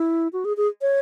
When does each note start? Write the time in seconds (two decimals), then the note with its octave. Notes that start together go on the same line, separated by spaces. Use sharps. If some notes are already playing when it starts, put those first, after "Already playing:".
Already playing: E4
0.33 F#4
0.45 G#4
0.57 G#4
0.82 C#5